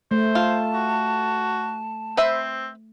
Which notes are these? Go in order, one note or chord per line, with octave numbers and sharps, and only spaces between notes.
A3 C5
F4 A5
F#4
C4 B4 C5 E5